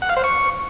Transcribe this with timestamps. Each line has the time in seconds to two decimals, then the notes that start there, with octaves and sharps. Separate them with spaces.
0.02 F#5
0.09 F5
0.17 C5
0.24 C#6